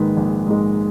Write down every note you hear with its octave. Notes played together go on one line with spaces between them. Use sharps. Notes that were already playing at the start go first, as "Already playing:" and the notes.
Already playing: A#1 G#2 D#3 G#3 B4
A#1
G#2 D#3 G#3